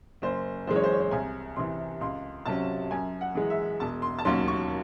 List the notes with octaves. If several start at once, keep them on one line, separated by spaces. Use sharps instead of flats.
F#1 C5
F#2 E3 G#3 C5
C#5
C5
C#5
C5
C2 G#5
C3 E3 C6
C#2 C6
C3 F#3 C#4 A5
F#2 G#5
F#5
E3 G#3
E5
E1 A5
C6
A5
D#2 D#3 F#3 C#4 C6
C#6